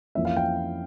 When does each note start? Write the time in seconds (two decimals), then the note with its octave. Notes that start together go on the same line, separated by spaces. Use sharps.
0.15 F2 E3 A#3 C#4 E5
0.25 F5
0.37 G5